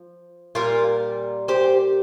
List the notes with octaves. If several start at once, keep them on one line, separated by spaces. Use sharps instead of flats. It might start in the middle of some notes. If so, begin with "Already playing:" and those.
Already playing: F3
A#2 G3 F4 A#4
G4 C5